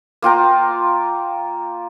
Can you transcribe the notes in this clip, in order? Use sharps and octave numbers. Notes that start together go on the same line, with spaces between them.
A#3 F4 G5 A#5